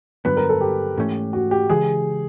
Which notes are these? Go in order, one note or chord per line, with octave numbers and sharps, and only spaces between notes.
G2 D3 F#3 B3 B4
A#4
A4
G4
G#2 E3 A3 C#4
F#4
G4
C#3 E3 G#3 G#4